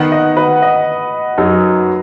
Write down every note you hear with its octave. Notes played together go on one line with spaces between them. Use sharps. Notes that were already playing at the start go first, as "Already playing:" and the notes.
Already playing: D#3 B3 D#4 F#5
D#5
B4
D#5
F#2 F#3 D#4